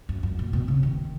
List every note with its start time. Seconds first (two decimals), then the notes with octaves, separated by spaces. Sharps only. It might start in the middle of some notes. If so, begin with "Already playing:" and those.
0.09 F#2
0.23 F#2
0.39 A#2
0.53 B2
0.68 C#3
0.83 D#3